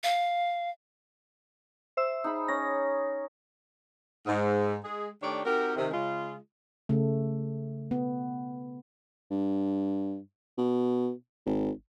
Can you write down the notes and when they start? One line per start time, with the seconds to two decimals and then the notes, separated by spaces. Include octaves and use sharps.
0.04 F5
1.97 C5 E5 E6
2.24 D#4 G#4 B5
2.48 C#4 A#6
4.26 G#2
4.84 G#3 G#4
5.22 D#3 A3 D4 G4 C#5 D5
5.45 C4 D#4 F#4 G4 A#4
5.76 C3 D#3
5.91 C#3 G#3 F4
6.89 C#3 A3
7.91 B3
9.31 G2
10.58 B2
11.46 G#1